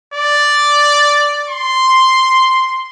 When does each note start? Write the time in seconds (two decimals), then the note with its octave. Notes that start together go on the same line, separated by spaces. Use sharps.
0.14 D5
1.49 C6